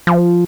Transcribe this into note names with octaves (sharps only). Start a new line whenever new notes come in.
F3